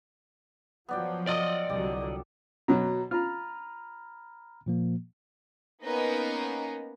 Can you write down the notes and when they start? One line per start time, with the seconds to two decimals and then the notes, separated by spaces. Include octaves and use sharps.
0.89 F3 F#3 B3 D5 G5
1.27 F4 A4 D5 D#5 D#6
1.70 C2 D3 F#3 G4
2.68 B2 F#3 A#5
3.11 F4 A#5 B5 F6
4.66 A#2 F3 A#3
5.83 A#3 B3 C#4 D#4 A#4 B4